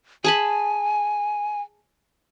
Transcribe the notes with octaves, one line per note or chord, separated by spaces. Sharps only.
G#4 G#5 A5 B5